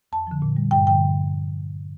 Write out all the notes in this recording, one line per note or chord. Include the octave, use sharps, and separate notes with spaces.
F2 A5
D3 F3
A#2
G3
G2 G5
D3 F3 G5